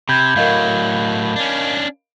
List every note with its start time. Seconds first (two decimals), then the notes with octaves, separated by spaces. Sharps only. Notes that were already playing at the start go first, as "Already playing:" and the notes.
0.09 C3 B5 G6 G#6
0.36 A2 F#3 A#4 D#5 F5
1.36 C#4 D4